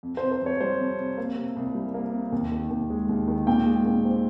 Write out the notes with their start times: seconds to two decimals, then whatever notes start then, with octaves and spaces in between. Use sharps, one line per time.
0.03 F2
0.17 C5
0.23 C3
0.32 C5
0.41 F2 C#5
0.60 G3 C5
0.80 F2
0.99 C3
1.18 A#3
1.37 C3
1.56 C2
1.75 G3
1.94 A#3
2.13 C3
2.32 D#2
2.52 D#3
2.70 D#2
2.90 G#3
3.09 D#2
3.28 D#3
3.47 A#2 G5
3.66 G#3
3.86 A#2
4.05 C4